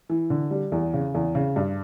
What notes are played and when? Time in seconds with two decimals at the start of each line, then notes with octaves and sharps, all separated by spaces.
0.09 E3
0.30 D3
0.51 G3
0.72 E2
0.94 C#3
1.14 E2
1.35 C#3
1.56 G2